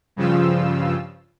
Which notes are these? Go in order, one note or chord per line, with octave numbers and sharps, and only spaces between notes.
G2 C#3 F3 F4 E6